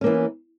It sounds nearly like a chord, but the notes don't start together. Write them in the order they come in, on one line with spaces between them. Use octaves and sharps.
C#4 A#3 E3